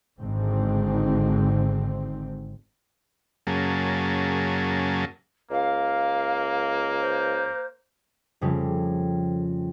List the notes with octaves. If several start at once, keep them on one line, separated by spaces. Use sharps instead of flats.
G#1 G#2 D3 C4
F#2 C#3 F#3 A#3 G#4 A5
C#2 A#3 F5
C5
F2 C#3 G3 A3